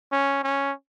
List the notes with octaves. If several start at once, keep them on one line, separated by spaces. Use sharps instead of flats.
C#4
C#4